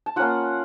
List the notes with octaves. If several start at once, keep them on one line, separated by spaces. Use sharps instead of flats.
A5
A#3 C#4 F4 F#5 A#5